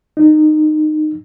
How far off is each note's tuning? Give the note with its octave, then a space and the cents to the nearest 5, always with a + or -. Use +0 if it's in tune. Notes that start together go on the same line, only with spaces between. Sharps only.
D#4 -20